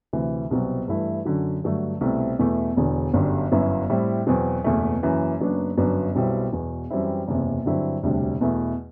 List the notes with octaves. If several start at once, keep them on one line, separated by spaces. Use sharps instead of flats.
D2 C3 E3
C2 B2 F#3 C4
G2 E3 A3 E4
F#2 D3 F#3
G2 D3 F#3 A3
C2 B2 A3 C4 E4
E2 B2 A3 E4
E1 E2 D3
G1 F#2 D3 G3
G1 F#2 F#3 B3 E4
A2 G3 C4 E4
E2 B2 F#3 C4
F#1 E2 B2 A3
F#1 F#2 E3
F#1 F#2 F#3 B3 D4
G1 F#2 F#3 B3 D4
B1 B2 G3 C4 E4
E1 E2 B2
F#2 E3 G3 C4 E4
F#1 E2 C3
G2 D3 F#3 C4 E4
E1 D2 C3 G3 D4
E2 B2 A3 E4